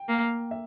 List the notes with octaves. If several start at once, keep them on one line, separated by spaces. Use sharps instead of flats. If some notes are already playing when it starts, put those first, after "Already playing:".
Already playing: G5
A#3
E5